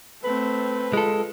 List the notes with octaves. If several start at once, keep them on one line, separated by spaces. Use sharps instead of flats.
A3 C4 B4
G#3 F4 A4